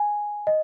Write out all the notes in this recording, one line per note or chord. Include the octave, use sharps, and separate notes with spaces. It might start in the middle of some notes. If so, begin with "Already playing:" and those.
Already playing: G#5
D#5